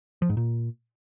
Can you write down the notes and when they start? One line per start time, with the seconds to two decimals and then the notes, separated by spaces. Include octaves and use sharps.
0.22 F3
0.29 G#2
0.37 A#2